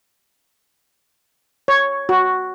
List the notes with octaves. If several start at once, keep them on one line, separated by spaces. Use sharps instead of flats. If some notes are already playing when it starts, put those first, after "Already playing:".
C#5
F#4